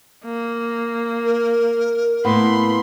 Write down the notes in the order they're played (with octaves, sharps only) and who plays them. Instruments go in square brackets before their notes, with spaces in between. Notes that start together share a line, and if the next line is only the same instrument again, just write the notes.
[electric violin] A#3
[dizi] A#4
[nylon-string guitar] A2 A#3 [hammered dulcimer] B3 [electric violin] B5 C6